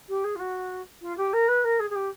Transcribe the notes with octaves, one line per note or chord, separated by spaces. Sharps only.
G4
G#4
F4
F#4
F4
G4
A#4
B4
A#4
G#4
G#4
G4